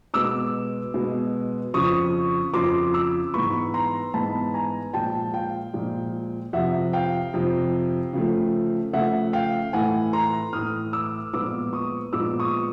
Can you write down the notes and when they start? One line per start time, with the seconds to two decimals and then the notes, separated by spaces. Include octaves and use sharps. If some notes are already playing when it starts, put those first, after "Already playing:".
0.14 B2 G#3 B3 D6 E6
0.94 B2 G#3 B3
1.74 F2 C#3 F3 C#6 D#6
2.54 F2 C#3 F3 C6 D6
2.94 D6 E6
3.34 G#2 E3 G#3 B3 B5 C#6
3.74 A#5 C6
4.14 G#2 E3 G#3 B3 A5 B5
4.54 G#5 A#5
4.93 A#2 F3 G#3 G5 A5
5.34 F5 G5
5.73 A#2 F3 G#3
6.53 F2 C3 F3 E5 F#5
6.93 F5 G5
7.34 F2 C3 F3
8.13 C#3 F3 A3
8.93 C#3 F3 A3 E5 F#5
9.33 F5 G5
9.73 A2 E3 A3 F#5 G#5
10.13 A#5 C6
10.53 A2 E3 A3 D#6 F6
10.93 D6 E6
11.33 A#2 F3 G#3 B3 D6 E6
11.73 C#6 D#6
12.13 A#2 F3 G#3 B3 D6 E6
12.39 C#6 D#6